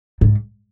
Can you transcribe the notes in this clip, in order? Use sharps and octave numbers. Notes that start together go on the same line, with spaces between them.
G#2